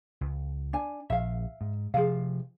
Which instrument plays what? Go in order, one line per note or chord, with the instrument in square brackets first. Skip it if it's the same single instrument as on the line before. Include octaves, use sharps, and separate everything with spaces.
[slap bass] C#2
[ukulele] D4 G#5
[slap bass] A#1 [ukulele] E5 F5
[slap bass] G#2
[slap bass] C3 F3 [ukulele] G#4 F5